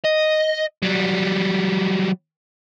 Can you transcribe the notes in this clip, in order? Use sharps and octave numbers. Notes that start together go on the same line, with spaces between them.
D#5
F#3 G3